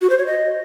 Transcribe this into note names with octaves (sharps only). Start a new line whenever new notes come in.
F#4
C5
C#5
D#5